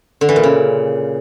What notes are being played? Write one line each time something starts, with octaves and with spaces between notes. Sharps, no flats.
D3
E3
A#2
C#3